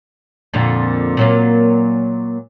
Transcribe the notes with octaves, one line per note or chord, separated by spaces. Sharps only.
F2 A#2 D3
A#2 F#3 A#3